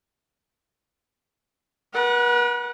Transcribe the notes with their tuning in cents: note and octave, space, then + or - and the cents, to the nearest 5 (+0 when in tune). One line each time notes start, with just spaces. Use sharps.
B4 -45 F#5 -5